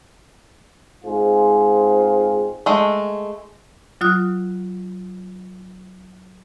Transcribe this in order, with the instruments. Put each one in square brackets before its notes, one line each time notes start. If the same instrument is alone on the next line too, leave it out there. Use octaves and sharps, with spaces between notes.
[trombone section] G#2 C4 F4 G#4
[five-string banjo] G#3 A3
[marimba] F#3 F4 D#6 F#6